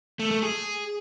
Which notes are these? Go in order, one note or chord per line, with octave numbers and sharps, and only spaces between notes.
A3
A3
G#4